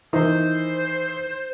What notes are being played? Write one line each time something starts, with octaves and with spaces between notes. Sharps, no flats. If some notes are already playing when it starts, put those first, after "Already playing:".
D#3 E3 D#4 C5